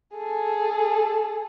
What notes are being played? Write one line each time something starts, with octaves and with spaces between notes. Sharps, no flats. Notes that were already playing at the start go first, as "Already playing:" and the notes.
G#4 A4